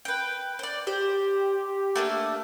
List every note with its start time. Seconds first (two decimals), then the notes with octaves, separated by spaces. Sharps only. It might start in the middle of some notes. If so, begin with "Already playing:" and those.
0.05 B4 G5
0.59 C5 D5
0.87 G4 C5
1.96 A3 A#3 D4